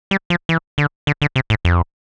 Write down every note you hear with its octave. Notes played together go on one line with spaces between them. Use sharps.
G3
F3
E3
D3
D3
D3
C3
A2
F2